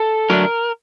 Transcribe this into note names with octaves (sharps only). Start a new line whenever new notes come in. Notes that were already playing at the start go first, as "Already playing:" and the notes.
Already playing: A4
D3 F#3 A3 D4 A#4